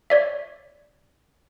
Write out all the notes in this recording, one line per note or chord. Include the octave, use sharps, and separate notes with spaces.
C#5 D5 E5